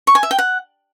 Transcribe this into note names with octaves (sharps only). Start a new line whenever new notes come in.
C#6
G#5
E5
G5
F#5